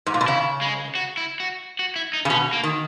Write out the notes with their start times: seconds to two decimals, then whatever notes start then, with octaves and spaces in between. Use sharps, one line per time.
0.06 G#2
0.14 A#2
0.21 B2
0.27 C#3 E4
0.61 G#3
0.95 F#4
1.17 E4
1.40 F#4
1.79 F#4
1.96 E4
2.13 D#4
2.25 C#3
2.30 B2 C#4
2.53 A#3
2.63 D#3